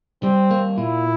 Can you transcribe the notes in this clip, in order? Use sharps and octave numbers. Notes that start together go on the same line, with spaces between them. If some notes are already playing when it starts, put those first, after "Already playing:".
G3 C4
A#3
A#2 E4